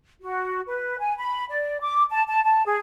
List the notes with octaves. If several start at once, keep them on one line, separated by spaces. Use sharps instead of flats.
F#4
B4
G#5
B5
D5
D6
A5
A5
A5
G#4